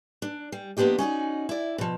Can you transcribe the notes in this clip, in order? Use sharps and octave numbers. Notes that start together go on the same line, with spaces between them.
D4
G3
F3 A#3 B3 D4 G4 D#5
C#4 D#4 F#4 D5
E4 D5
B2 F3